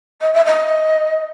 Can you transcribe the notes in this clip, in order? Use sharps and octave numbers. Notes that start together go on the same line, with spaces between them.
D#5
E5
D#5